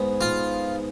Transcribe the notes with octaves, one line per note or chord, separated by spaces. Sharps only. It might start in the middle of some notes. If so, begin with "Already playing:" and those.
Already playing: G#2 B3
F4